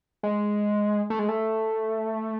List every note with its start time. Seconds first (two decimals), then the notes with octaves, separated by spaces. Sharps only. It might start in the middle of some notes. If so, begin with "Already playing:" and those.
0.23 G#3
1.10 A3
1.19 G#3
1.29 A3